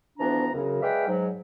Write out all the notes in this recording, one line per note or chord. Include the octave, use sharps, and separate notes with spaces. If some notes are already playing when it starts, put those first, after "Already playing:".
D2 E3 F3 B3 D4 A#5
F#2 C#3
G#3 B4 D5 E5 F5 G5
G#2 F#3